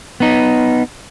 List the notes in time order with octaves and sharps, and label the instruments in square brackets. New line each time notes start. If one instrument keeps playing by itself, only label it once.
[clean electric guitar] B3 D#4